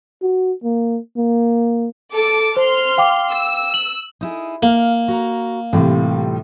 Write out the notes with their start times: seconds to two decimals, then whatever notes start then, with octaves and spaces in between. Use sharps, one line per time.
0.22 F#4
0.64 A#3
1.17 A#3
2.13 A4 D6
2.57 C5 C6 F6
2.98 F5 G5 D6
3.31 E6
3.74 F#7
4.21 D#4 E4 G#4
4.63 A#3 F5
5.08 F#4 A#5
5.73 A2 C3 E3 G3 F4